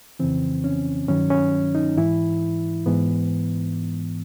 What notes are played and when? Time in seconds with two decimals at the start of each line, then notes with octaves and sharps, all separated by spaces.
0.19 F2 C#3 E3 C4
0.64 C#4
1.08 G2 D#3 F#3 C#4
1.30 C#4
1.75 D#4
1.97 G#2 E3 E4
2.86 G#2 E3 B3